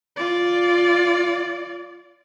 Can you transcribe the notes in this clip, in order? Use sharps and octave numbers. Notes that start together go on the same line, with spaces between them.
F4 D5